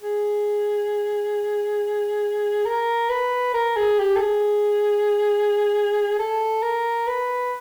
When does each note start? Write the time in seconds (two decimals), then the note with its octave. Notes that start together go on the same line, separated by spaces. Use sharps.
0.02 G#4
2.66 A#4
3.10 B4
3.54 A#4
3.76 G#4
3.99 G4
4.16 A4
4.21 G#4
6.19 A4
6.63 A#4
7.08 B4